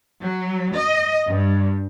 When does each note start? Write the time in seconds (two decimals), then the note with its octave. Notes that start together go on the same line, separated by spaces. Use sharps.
0.22 F#3
0.74 D#5
1.27 G2